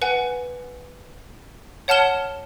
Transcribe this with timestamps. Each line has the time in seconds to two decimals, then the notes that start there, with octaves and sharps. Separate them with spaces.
0.02 B4 F#5 G#5
1.88 C#5 F#5 A5 F6 E7 G7